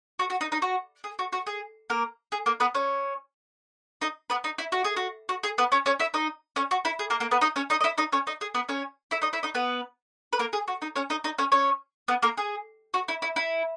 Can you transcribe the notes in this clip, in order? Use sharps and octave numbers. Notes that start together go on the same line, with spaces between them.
F#4
F#4
D#4
D#4
F#4
G#4
F#4
F#4
G#4
A#3 A#4
G#4
A#3 A#4
B3 B4
C#4 C#5
D#4 D#5
B3 B4
D#4
E4
F#4
G#4
F#4
F#4
G#4
B3 B4
C#4 C#5
C#4 C#5
E4 E5
D#4 D#5
C#4 C#5
F#4
E4
G#4
A#3 A#4
A#3 A#4
B3 B4
D#4 D#5
C#4 C#5
D#4 D#5
D#5
E4 E5
D#4 D#5
C#4 C#5
D#4 D#5
G#4
B3 B4
C#4 C#5
E4 E5
D#4 D#5
E4 E5
D#4 D#5
B3 B4
B4
A#3 A#4
G#4
F#4
D#4
C#4 C#5
D#4 D#5
D#4 D#5
C#4 C#5
C#4 C#5
B3 B4
A#3 A#4
G#4
F#4
E4
E4
E4